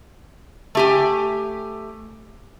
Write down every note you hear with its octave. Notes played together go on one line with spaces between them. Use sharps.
A3 G4 G#5